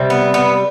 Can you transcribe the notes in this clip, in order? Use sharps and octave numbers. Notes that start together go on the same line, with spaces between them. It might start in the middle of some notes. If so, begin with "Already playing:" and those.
Already playing: C3 G3
B3
B3